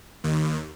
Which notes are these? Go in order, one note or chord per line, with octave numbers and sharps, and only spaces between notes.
D#2